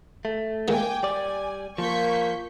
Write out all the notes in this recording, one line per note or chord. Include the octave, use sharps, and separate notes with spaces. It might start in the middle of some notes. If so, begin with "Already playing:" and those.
A3
A#2 D#3 G#3 G5 G#5 D6
G3 D5 G#5
F3 A#3 C#6 G6 B6